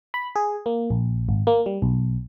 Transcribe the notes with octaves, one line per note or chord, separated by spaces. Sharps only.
B5
G#4
A#3
A#1
G#1
A#3
G3
B1